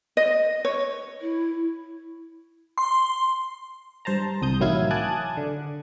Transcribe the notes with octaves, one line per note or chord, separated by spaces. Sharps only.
D#5
C#5
E4
C6
G2 C5 A5 A#5
C2 D#6 G6
A1 D#3 F#3 E4 F5 G#6
G#5 A5 D6 D#6 F#6 G#6
D3